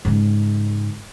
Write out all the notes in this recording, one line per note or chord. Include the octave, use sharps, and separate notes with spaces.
G#2 C#3